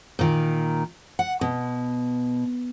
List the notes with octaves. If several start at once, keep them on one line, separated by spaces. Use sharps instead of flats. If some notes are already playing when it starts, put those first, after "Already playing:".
A#2 D#3
F#5
B2